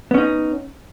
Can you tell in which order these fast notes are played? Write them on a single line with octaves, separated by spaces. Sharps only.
B3 C#4 D#4